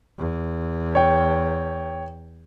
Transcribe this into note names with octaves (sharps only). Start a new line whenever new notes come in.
E2
C#5 G5